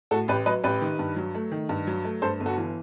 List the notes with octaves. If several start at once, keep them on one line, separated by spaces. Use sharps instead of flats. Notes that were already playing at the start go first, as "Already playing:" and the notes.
A2 F#4 A4
A1 G4 B4
F#3 B4 D#5
A1 G4 B4
D#3
G2
F#3
A3
D#3
G2
F#3
A3
G2 A4 C5
G1
F#4 A4
E3